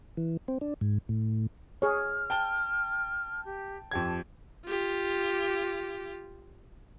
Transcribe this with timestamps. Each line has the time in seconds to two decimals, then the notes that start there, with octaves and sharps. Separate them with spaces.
0.17 E3
0.48 C4
0.61 D4
0.81 G#2
1.09 A2
1.82 G#4 C#5 F6
2.30 G5 A5 G7
3.45 G4
3.91 F2 G4 A5 G#6
4.66 F4 G4